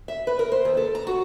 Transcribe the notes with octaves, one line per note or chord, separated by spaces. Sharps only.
E5
B4
A#4
C5
D#2
A4
A#5
F#4